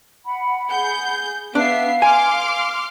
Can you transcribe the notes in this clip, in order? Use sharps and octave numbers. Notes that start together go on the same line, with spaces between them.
F#5 B5
G#4 G6
B3 D4 E5 F5 C7
G#5 C6 D6 F6